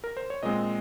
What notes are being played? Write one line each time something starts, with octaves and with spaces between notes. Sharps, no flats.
A#4
C5
C#5
A#2 G#3 C4 D#5